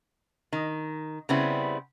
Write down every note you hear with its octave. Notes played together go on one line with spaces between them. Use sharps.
D#3
C#3 G3 B3 C4 E4